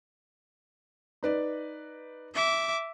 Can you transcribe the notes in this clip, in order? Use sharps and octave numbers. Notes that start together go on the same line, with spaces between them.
D#4 B4 D5
E5 D6